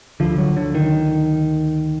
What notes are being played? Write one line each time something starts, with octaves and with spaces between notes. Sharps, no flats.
D2 D3 F3
F#3
D3
D#3